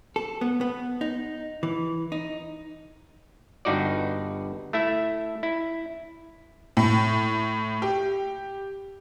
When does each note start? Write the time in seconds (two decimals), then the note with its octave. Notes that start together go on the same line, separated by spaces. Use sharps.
0.16 A4
0.41 B3
0.61 B3
1.01 D#4
1.63 E3
2.12 D#4
3.65 G1 G2 D#4 F#4 D5
4.73 A3 E4 E5
5.43 E4
6.77 A2
7.82 G4